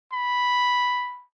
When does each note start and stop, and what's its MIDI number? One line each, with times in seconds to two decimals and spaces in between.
0.13 1.24 83